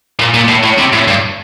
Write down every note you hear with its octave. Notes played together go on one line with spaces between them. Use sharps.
A#2
A#2
A2
A2
C3
A2
G2